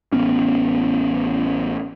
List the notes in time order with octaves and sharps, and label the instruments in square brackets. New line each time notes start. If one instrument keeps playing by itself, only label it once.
[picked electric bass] A1 B3 C#4